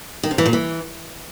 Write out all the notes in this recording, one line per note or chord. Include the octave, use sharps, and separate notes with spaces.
D#3
C3
E3
A#2
E3